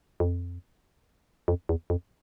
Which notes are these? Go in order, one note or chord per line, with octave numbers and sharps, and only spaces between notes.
F2
F2
E2
F2